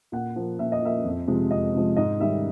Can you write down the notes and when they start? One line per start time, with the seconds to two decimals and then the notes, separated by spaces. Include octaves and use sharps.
0.12 A#2 F#5
0.36 F3 A#3
0.59 A#2 E5
0.72 D#5
0.82 F3 A#3 E5
1.05 F2
1.28 C3 F3 G#3
1.51 F2 D#5
1.74 C3 F3 G#3
1.96 G#2 D#5
2.20 D#3 G3 E5